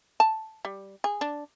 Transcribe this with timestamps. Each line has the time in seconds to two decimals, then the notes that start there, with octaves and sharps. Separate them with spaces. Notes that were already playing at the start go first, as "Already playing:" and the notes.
0.20 A5
0.65 G3
1.04 G#4
1.21 D4